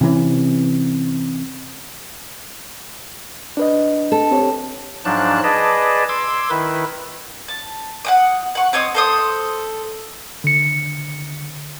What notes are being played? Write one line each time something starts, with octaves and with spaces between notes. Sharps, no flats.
C3 E3 C#4
D4 B4 D#5
A4
C4 G4 C#5
G#2 F3 F#3 D4 A5 F#6
G#4 B4 D5 D#5 A5
C6 D6 E6 G#6
D#3 E4 B4
A5
F#5 G5 D#6
F#5 C#6
C4 C#5 D#5 D#6
A4 C5 D#6
D3 C#7